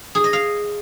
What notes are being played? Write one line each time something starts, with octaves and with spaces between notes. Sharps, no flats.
G#4
D#5
F5